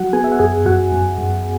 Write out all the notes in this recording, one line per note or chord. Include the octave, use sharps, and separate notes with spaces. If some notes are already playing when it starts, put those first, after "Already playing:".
Already playing: F#3 F#4 F#5
B3 G#4 G#5
E5
F#5
F#2 G#4 G#5
F#2 F#4 F#5
F#2
F#2